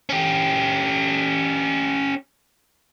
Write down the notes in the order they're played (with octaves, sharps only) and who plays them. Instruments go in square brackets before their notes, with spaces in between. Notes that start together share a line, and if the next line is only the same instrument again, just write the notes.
[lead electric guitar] C#4 G4